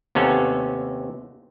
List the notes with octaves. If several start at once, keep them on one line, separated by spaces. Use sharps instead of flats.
D#2 C3 B3 C#4 A4